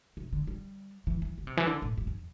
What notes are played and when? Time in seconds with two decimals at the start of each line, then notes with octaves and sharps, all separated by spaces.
0.17 C3
0.33 D3
0.47 G3
1.07 E3
1.22 E3
1.38 D3
1.47 C3
1.57 E3
1.67 D3
1.82 A2
1.97 G2
2.07 E2